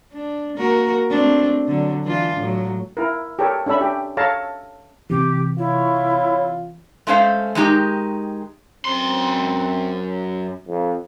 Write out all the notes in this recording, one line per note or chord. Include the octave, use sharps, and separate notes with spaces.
D4
A#3 F#4 A#4
A3 C4 D4
D3 F#3
E3 D4 F4
A2 F#3
E4 A#4
G4 A4 A#4 C#5
C#4 D4 A4 E5 B5
G4
A4 C#5 F5 A5 A#5
C3 E3 G4
E4 F4 C#5
G#3 A3 C#4 C5 F5
D#3 G#3 D#4 G4
F#2 C4 C6
F2